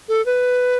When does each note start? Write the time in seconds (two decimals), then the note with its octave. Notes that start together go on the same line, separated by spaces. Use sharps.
0.09 A4
0.26 B4